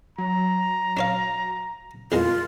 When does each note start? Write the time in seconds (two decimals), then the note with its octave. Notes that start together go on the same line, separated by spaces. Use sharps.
0.18 F#3 A#5
0.97 D4 C#5 F5
2.12 E2 G#3 A#3 F4